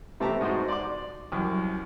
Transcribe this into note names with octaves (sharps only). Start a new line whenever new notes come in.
C3 A3 B3 G4 A5 A#5
G#2 G#3 D#4 F#4 C5
D5 C6 D6
C2 F#2